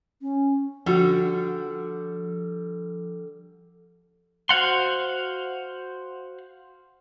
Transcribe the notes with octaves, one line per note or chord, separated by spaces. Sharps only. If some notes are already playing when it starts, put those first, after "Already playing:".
C#4
D3 F3 G3 F#4
F#4 C5 F5 F#5 C6